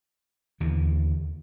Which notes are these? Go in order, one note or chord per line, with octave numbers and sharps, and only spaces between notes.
D#2 D3 E3